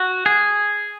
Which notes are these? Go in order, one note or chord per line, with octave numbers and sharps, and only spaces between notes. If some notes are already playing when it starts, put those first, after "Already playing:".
Already playing: F#4
G#4